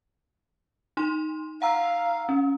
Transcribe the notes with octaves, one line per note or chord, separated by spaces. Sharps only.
D#4 C6
F5 F#5 A#5 E6
C#4